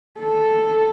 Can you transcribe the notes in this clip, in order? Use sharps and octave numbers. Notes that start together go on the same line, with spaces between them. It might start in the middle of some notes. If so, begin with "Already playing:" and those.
A4